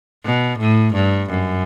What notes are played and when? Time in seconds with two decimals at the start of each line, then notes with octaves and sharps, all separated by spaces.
0.25 B2
0.60 A2
0.94 G2
1.30 F#2